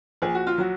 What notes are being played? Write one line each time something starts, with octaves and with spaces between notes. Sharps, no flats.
A#1 G#4
F#4
F4
F#3 F#4